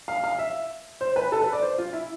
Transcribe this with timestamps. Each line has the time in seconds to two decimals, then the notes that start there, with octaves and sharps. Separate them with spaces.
0.08 F5
0.24 F5
0.39 E5
1.01 C5
1.16 B4
1.32 A4
1.41 B4
1.53 D5
1.62 C5
1.78 F4
1.93 E4